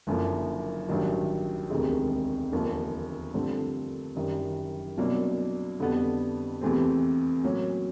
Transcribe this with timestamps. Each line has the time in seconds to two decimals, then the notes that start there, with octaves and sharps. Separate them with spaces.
0.07 F#1 F#2 D3 F3 A#3
0.89 A1 G2 D#3 F#3
1.70 E1 D2 C3 D#3 G#3
2.52 E1 D#2 D3 F3 A#3
3.34 G2 D3 F3 A3 C4
4.16 F#1 F#2 D#3 G3
4.98 C2 B2 F#3 A#3 D4
5.80 F2 D3 G3 B3
6.61 E2 C3 E3 A3 C4
7.43 A2 F#3 A#3 C#4